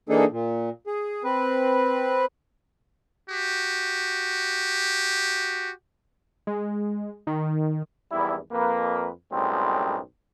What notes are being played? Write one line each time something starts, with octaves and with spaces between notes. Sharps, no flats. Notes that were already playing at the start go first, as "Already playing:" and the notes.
E3 A#3 D4 D#4 G#4 A4
A#2
G#4
C4 B4
F#4 G4
G#3
D#3
G#1 E2 G3 E4
F2 A#3 B4
B1 F#2 A2 G3 G#3 C4